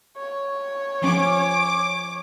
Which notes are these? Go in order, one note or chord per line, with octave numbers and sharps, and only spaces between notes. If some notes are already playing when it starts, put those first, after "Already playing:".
C#5
F3 C#4 D6